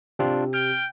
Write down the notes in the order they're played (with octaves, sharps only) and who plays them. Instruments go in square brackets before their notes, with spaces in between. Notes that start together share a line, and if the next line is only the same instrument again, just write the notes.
[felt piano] C3 [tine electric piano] C4 D4 F4
[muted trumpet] G5 [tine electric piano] F6